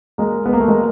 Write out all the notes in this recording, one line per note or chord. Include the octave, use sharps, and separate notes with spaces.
G#3 A#3
B3
A#3
A3
G#3 A#3